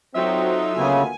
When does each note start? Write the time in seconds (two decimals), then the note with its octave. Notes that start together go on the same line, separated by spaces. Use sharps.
0.15 F#3 C4 D#4 F4 A4 E5
0.78 D2 C#3 A#3 B3 G#5